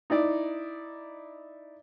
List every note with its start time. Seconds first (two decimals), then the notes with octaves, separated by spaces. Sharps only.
0.10 D#4 E4 D5